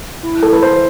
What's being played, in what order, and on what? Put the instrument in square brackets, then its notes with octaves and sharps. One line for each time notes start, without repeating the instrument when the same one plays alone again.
[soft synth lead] E4
[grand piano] A4
B4
C5